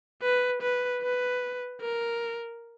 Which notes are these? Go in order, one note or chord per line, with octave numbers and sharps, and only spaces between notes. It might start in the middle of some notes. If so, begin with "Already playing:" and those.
B4
B4
B4
A#4